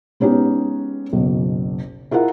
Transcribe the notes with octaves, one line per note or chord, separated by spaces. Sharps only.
G#3 B3 C#4 D#4 G4
F#1 B1
E4 F4 G#4 A#4 F#5